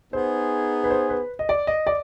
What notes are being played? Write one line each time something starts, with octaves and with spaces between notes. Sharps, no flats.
B3 D#4 G#4 C5
B4
C5
B4
D#5
D5
D#5
D5